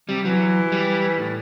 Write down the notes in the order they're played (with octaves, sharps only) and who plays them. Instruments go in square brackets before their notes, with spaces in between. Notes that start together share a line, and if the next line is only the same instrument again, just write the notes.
[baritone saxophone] C3 [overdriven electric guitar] G3
[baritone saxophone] E3 [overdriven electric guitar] F#3
[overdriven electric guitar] G3
[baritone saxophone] A2